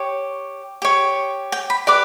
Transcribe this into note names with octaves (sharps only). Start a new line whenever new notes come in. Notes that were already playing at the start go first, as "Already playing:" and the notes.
Already playing: G4 C#5
G4 C#5
G5
B5
G4 B4 D5 D6